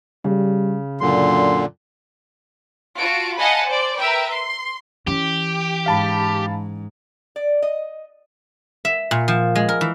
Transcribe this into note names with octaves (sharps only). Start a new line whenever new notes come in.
C#3 G3
F#2 A#2 D3 C6
F4 F#4 A5 D7
D#5 F5 F#5 G#5 A5 B5
C5 D5
A#4 B4 E5 G5
C6
E3 C#4 G4
G#2 F5 A5 B5
D5
D#5
E5
A#2
F3
G#3
A#4
E3